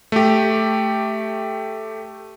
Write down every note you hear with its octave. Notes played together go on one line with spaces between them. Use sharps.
A3 G4